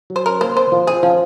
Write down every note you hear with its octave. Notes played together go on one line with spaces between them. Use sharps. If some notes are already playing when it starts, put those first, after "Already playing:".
F#3
C5
C#4 A#4
A#3 C5
C4 C5
F3
C4 G#4
F3 C#4